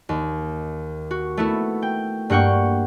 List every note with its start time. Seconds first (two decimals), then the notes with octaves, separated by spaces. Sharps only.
0.09 D#2
1.11 F#4
1.37 A3 B3 E4
1.82 G5
2.30 G2 A#3 F#5 G5 C#6